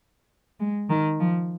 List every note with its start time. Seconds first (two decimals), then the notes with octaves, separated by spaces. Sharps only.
0.60 G#3
0.89 D#3
1.19 F3